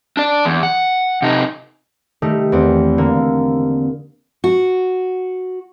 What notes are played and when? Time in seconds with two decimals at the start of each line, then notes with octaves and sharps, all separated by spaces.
0.17 D4 D5
0.45 E2
0.63 F#5
1.22 C3 D#4
2.22 D#3 G3 A3 D#4
2.52 E2 B3 C4
2.98 D3 A#3
4.44 F#4